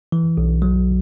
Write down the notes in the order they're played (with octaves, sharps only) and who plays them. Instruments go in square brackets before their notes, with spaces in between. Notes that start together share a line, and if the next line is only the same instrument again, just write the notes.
[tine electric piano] E3
B1
F#3